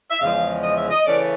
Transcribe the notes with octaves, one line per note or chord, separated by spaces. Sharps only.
E5
E2 C#3 F3 G#3 F5
D#5
E5
D#5
C#3 E3 A3 C#4 D5